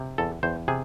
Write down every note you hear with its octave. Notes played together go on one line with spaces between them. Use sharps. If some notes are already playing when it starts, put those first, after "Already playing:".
Already playing: C3
E2 A4
E2 C5
C3 G#4